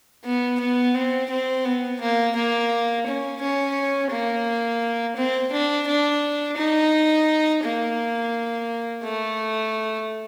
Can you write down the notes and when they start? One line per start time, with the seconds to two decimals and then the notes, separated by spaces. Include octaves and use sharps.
0.24 B3
0.60 B3
0.95 C4
1.30 C4
1.65 B3
2.01 A#3
2.35 A#3
3.06 C#4
3.41 C#4
4.11 A#3
5.16 C4
5.52 D4
5.88 D4
6.57 D#4
7.64 A#3
9.03 A3